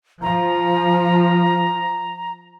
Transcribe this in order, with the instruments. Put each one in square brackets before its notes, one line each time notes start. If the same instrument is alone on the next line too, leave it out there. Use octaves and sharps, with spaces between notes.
[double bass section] F3 [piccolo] A#5